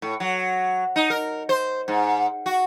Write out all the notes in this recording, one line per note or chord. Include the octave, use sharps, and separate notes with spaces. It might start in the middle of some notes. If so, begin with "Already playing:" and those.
A2
F#3
D#4
A#4
C5
G#2
F#4